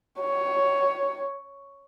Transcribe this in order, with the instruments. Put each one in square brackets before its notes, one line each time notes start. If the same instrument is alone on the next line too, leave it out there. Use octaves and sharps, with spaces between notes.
[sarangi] C#5